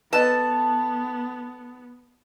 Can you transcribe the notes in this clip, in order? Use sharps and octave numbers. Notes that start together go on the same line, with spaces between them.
B3 A4 B4 D#5 A5